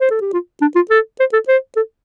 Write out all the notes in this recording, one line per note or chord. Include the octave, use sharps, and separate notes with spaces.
C5
A4
G4
F4
D4
F4
A4
C5
A4
C5
A4